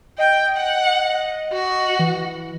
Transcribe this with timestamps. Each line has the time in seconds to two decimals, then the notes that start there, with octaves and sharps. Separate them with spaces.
0.18 D#5 G5
0.57 F#5
1.53 F#4
1.99 E3